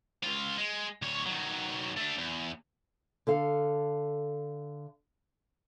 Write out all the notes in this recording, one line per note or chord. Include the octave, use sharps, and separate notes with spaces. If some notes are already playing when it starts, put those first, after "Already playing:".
C#2 F4
G#3
D2 C#5
D#3 F#3
A3 D4
E2
D3 A4 F5